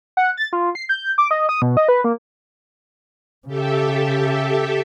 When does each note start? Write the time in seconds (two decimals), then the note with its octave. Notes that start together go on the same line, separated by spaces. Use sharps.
0.17 F#5
0.37 A6
0.53 F4
0.75 C7
0.89 G6
1.18 D6
1.31 D#5
1.49 D#6
1.62 B2
1.77 D#5
1.88 B4
2.04 A#3
3.47 C#3 G4 A4 E5